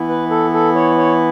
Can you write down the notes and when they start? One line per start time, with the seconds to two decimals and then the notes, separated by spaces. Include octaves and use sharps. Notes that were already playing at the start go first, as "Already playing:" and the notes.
Already playing: E3 B3 E4
0.09 B4
0.31 A4
0.54 A4
0.76 C#5
0.98 C#5